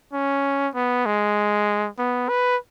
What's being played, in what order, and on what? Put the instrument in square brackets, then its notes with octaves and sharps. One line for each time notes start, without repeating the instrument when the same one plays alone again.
[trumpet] C#4
B3
G#3
B3
B4